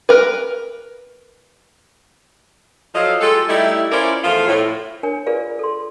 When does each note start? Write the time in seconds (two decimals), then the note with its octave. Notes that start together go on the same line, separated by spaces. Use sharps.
0.09 A#4 B4
2.94 F3 F#3 A4 D#5 F5
3.21 G#3 F4 G4 A4
3.48 G3 A3 D#4 E4
3.91 C#4 E4 F4 A#4 C5 D5
4.24 E2 F3 A3 F4 C5 F5
4.48 A2
5.03 D4 A#4 C#5 G#5
5.26 F4 G#4 A#4 B4 D5 F5
5.59 A4 C6